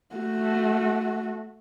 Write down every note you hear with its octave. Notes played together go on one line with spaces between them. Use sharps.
A3 F#4